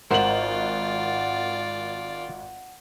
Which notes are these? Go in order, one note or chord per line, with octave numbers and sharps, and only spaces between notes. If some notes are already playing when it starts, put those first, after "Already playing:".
G#1 F4 A#4 C5 D5 F#5 F#7